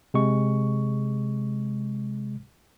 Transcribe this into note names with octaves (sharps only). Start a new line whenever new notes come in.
C3 G#3 C#6